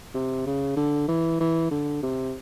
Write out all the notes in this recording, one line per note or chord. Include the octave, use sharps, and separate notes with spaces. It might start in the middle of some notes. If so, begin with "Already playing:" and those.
C3
C#3
D3
E3
E3
D3
C3